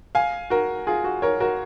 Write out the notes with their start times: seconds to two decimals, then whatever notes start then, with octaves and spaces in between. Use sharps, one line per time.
0.15 F5 G#5
0.50 F#4 A#4
0.87 F4 G#4
1.04 F#4
1.22 A#4 C#5
1.40 F#4 A#4